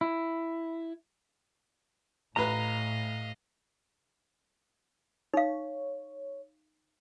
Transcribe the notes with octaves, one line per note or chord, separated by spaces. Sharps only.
E4
A1 A2 B4 D#5 F5 A#5
D#4 C#5 F5